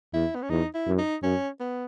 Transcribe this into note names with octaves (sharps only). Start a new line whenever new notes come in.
E2 E4
B3
C#4
E2 D#4
E4
F#2
D#4
F#2 C#4
B3